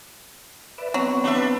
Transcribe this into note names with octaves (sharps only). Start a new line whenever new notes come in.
B4 D5 E5
F#3 B3 C4
D4 B4 E5